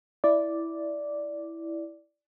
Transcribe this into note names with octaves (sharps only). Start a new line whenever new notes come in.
E4 D5